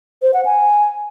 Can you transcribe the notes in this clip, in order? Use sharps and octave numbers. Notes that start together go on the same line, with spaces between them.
C5
F#5
G#5